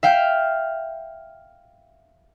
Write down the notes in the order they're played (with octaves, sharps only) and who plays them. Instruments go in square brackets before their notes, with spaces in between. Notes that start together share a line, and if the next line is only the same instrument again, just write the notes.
[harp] E5 F5 G5